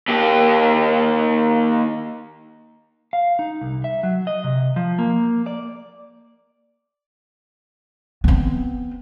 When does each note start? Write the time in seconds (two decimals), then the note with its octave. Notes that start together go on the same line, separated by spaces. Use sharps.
0.08 D#2 G4
3.13 F5
3.39 D#4
3.61 C2
3.84 E5
4.03 F#3
4.27 D#5
4.44 C3
4.76 F3
4.99 A#3
5.47 D5
8.24 B3 C4